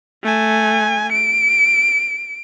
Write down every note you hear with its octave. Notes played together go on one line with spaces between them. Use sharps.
A3 G#5
D7